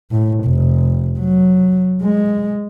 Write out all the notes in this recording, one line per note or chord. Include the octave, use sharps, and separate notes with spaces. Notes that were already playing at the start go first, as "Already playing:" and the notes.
A2
F1
F#3
G#3